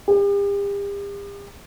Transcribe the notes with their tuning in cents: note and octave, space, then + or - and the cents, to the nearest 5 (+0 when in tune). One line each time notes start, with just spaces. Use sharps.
G4 +40